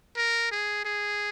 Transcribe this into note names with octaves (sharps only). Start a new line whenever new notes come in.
A#4
G#4
G#4